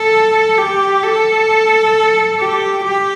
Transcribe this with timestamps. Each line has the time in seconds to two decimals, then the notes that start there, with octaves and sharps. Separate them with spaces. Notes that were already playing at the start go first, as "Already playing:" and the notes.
Already playing: A4
0.58 G4
1.03 A4
2.40 G4
2.85 G4